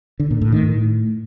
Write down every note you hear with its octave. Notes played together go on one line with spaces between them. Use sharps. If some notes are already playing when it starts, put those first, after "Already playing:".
D3
A#2
A2
D#3
A2